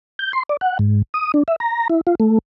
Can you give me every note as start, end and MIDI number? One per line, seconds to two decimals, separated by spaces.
0.19 0.32 91
0.33 0.43 84
0.49 0.57 74
0.61 0.78 78
0.79 1.02 44
1.14 1.32 87
1.34 1.43 62
1.48 1.56 76
1.60 1.88 82
1.90 2.01 64
2.07 2.15 65
2.20 2.39 57